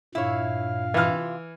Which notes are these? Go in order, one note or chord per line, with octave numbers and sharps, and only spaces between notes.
G2 A#2 E4 C#5 F5
C3 E3 F4 F6